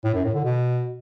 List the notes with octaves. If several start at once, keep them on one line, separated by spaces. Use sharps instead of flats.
A2
F#2
A2
D3
B2